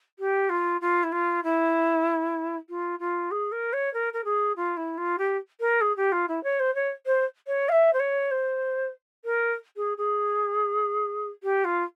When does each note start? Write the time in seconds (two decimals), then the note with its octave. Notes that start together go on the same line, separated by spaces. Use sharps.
0.19 G4
0.49 F4
0.81 F4
1.03 E4
1.12 F4
1.44 E4
2.69 F4
2.99 F4
3.31 G#4
3.52 A#4
3.73 C#5
3.93 A#4
4.13 A#4
4.24 G#4
4.56 F4
4.77 E4
4.97 F4
5.18 G4
5.60 A#4
5.81 G#4
5.96 G4
6.12 F4
6.28 E4
6.43 C#5
6.59 C5
6.75 C#5
7.06 C5
7.47 C#5
7.69 F5
7.72 E5
7.93 C5
7.99 C#5
8.31 C5
9.24 A#4
9.76 G#4
9.97 G#4
11.43 G4
11.64 F4